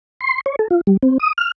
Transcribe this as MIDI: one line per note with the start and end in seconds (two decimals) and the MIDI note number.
0.21 0.41 84
0.46 0.56 73
0.59 0.68 69
0.71 0.81 65
0.87 0.97 55
1.03 1.18 60
1.20 1.33 87
1.38 1.51 89